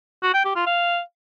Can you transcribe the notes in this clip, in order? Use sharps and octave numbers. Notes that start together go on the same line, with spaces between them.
F#4
G5
G4
F4
F5